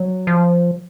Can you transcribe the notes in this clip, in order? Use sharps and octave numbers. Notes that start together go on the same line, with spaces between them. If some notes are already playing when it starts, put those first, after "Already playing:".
Already playing: F#3
F3